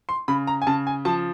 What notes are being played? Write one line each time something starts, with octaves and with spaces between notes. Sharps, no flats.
C6
C#3 B5
A#5
G#5
C#3 A5
G#5
F3 A5